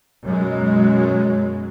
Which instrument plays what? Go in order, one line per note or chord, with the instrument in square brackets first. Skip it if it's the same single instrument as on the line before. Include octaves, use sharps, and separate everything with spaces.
[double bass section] F#2 B2 F#3 G#3